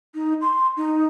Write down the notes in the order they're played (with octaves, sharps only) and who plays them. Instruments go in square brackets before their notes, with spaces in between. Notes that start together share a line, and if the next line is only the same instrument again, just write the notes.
[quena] D#4
C6
D#4